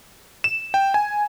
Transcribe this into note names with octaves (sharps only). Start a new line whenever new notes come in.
E7
G5
G#5